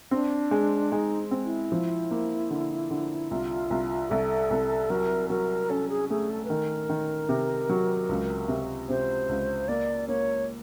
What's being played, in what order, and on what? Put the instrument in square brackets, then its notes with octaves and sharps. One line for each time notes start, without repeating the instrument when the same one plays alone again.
[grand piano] C4 [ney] D4
[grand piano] G#3
[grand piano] G#3 [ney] D#4
[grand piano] C4
[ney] E4
[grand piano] F3
A#3
D3
D3
[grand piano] C2 [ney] F4
[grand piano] C2
[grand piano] C2 [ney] A4
[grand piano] C2
[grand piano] F#3 [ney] A#4
[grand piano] F#3 [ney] A#4
[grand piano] C#4 [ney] A4
[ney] G#4
[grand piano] A3 [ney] G#4
[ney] A4
B4
[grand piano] D#3 [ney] A#4
[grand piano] D#3
C3
F#3
C#2
C3
[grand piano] C3 [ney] C5
[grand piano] C#2
[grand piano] A#3 [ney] D5
[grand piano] A#3 [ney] C#5